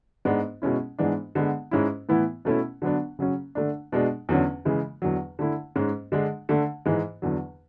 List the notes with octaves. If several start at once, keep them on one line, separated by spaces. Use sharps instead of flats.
G#2 G#3 B3 D4
B2 G#3 C#4 E4
G#2 E3 G#3 B3 D4
D3 G#3 B3
G#2 G#3 C#4 E4
A2 E3 B3 E4
B2 A3 C#4 E4
D3 F#3 B3 D4
C#3 F#3 C#4
D3 A3 D4
B2 G#3 D4
E2 D3 F#3 C#4
C#3 E3 G#3
E2 D3 F#3
D3 A3 E4
G#2 G#3 C#4
D3 G#3 D4
D3 A3 D4
G#2 E3 G#3
E2 D3 F#3